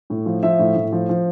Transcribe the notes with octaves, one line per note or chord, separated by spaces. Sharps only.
A2
F3
F3 E5
A2
A2
F3
F3